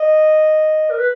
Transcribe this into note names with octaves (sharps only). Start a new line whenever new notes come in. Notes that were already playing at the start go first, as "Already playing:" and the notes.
Already playing: D#5
A#4
B4